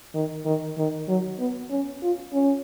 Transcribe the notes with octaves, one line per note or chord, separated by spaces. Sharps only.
D#3
D#3
D#3
F#3
B3
C#4
F4
C#4